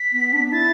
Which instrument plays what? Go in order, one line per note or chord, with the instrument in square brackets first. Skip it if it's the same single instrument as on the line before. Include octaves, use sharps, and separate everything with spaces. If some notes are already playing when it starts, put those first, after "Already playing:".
Already playing: [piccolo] B6
[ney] B3
D4
[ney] E4 [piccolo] A6